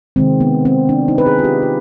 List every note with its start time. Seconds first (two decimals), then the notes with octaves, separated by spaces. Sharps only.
0.16 C3 D#3 G#3 C4
0.40 B3
0.65 C4
0.89 D4
1.08 D#4
1.18 B4
1.26 G#4
1.39 F4
1.44 G4
1.62 F4